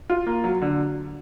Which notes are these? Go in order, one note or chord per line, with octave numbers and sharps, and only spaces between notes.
F4
A#3
F#3
D3